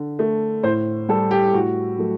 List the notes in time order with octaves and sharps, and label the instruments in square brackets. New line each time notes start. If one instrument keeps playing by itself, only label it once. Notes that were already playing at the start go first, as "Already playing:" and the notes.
Already playing: [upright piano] D3
A3
A2 C5
G3 A4
G4
A2 F#4
F#3 A3